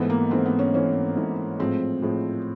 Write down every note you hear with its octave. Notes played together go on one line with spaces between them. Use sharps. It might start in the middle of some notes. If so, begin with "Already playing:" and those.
Already playing: G#2 E3 A3 B3
A#3
G#2 E3 A3 C4
B3
C#4
G#2 E3 A3 C#4
G#2 E3 A3
A2 F3 G#3 C4
A2 F3 G#3